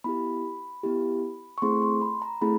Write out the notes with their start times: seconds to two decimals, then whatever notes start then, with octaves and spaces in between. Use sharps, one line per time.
0.04 B3 E4 G4 B5
0.83 B3 E4 G4
1.58 C#6
1.62 A3 C4 E4 G#4 C6
1.82 C6
2.02 B5
2.22 A#5
2.41 A3 C4 E4 G#4 B5